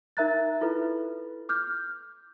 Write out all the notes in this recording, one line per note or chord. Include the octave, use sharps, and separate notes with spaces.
D#4 A#4 E5 A#5 F#6 A6
E4 F4 A4 B4
D6 F6 G6